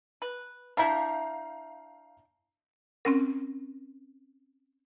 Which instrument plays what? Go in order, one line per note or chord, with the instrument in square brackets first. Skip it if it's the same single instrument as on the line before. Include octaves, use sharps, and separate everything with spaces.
[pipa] B4
[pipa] D4 E4 [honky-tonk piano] F5 A#5 G6
[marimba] C4 C#4 A#4